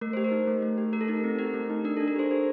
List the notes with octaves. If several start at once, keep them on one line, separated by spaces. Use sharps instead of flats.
A3 A#4
G4 C5
A#4
D#4
A3
A3
G4
A3 A#4
A4
D#4 A#4
C4
G4 A#4
A3
D#4
D4 A#4
D4 A4
A#4
G4 A4 C5
G4